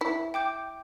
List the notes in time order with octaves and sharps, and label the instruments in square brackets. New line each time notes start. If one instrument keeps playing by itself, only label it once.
[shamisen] E4 [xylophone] E5
[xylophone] G5 D6 G6